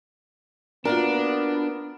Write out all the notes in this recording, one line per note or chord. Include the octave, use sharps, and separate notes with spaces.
A#3 B3 D4 F4 F#4 A#4